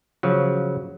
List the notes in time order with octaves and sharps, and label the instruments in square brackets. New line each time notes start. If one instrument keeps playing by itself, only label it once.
[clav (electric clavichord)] C#3 F3 F#3